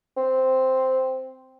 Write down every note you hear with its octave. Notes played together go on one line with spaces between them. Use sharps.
C4